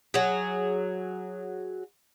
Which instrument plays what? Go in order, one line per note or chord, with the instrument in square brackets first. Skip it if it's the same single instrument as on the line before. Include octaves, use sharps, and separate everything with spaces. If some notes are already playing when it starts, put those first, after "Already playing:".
[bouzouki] F#3 G#4